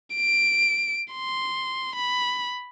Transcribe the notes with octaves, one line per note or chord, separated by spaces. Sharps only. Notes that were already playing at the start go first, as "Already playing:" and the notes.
D7
C6
B5